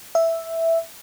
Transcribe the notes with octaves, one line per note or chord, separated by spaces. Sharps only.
E5